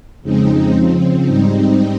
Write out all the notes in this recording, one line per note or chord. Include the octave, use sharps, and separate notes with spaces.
F2 C#3 G#3 C4 D#4
C#3 F3 C4
G#2 G3 C4 D#4